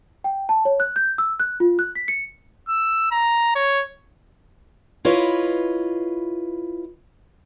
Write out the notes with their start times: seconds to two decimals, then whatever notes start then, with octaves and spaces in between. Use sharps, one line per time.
0.24 G5
0.49 A5
0.65 C#5
0.80 F#6
0.96 G6
1.18 E6
1.40 F#6
1.60 F4
1.79 F#6
1.95 B6
2.08 C#7
2.69 E6
3.11 A#5
3.55 C#5
5.05 E4 F4 B4 C#5 D#5